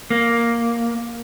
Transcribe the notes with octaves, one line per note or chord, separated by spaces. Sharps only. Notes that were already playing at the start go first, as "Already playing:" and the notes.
A#3